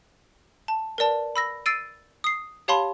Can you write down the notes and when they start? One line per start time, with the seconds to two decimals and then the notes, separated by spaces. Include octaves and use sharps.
0.68 A5
0.98 A#4 B4 D5 A5
1.36 B5 E6 A#6
1.66 E6 A6 C7 D7 D#7
2.24 D#6 C7
2.68 G4 C#5 F5 A5 B5 C6